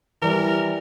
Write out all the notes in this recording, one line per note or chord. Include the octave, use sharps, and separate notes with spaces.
E3 G3 A#4